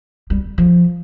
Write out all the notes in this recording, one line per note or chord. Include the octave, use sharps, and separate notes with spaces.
G3
F3